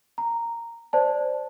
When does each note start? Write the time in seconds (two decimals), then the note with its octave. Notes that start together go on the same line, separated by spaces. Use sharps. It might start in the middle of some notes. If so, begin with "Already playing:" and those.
0.18 A#5
0.93 C5 D5 A5